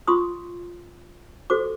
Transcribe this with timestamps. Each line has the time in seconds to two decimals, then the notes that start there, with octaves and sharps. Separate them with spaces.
0.07 F4 C6 C#6 D#6
1.50 F#4 A4 C5 D6